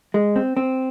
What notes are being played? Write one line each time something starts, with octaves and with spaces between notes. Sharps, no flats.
G#3
C4
C4